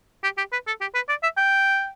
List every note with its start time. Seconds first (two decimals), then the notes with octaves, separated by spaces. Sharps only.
0.23 G4
0.37 G4
0.52 B4
0.67 A4
0.81 G4
0.95 B4
1.09 D5
1.23 E5
1.37 G5